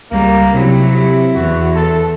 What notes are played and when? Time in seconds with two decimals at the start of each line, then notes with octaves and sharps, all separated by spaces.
0.11 C#2 G3 A#3
0.53 C3 F#3 E4
1.34 E2 F#4
1.75 A4